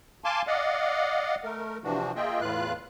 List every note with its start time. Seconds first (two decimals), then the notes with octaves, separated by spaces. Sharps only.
0.24 F5 G#5 A5 C6 D6
0.47 D5 D#5 F5 F#5
1.44 A3 A#4
1.84 C3 E3 F3 D4 F#4
2.16 A#3 F4 G#4 D#5 E5 G5
2.41 E2 A2 F4 B4 F5 F#6